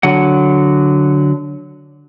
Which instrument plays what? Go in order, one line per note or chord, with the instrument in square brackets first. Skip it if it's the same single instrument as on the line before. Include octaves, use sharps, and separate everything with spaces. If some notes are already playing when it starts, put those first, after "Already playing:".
[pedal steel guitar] D3 F#3 F#5